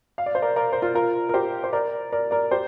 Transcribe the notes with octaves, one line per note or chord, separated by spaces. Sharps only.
F5
D5
C5
A#4 D5
A#4 D5
C5
F4 A#4
F4 A#4
A#4
G4 C5
C5
A#4 D5
A#4 D5
A#4 D5
G4 C5